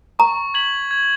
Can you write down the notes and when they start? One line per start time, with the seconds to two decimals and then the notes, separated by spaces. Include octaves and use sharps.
0.19 A#5 C#6
0.54 G#6 B6 F#7
0.91 G#6